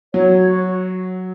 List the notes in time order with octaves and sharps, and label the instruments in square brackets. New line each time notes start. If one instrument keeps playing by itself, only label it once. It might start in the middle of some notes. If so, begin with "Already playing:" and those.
[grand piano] F#3 [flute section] C#5
[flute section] F#4